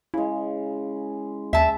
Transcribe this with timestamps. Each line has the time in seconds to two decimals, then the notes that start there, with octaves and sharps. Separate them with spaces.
0.14 C#3 G#3 E4
1.53 D#2 E5 A5